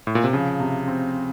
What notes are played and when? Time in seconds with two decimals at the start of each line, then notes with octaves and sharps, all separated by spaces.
0.07 A2
0.15 A#2
0.24 C3
0.33 C#3 F3
0.60 C3
0.88 C4